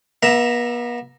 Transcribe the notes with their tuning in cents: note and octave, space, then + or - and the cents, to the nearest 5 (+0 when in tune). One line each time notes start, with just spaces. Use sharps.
B3 -40 E5 +0 A#5 +0